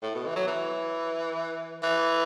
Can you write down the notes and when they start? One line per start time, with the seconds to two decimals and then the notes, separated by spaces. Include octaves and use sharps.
0.02 A2
0.15 B2
0.26 E3
0.36 F#3
0.47 E3
1.83 E3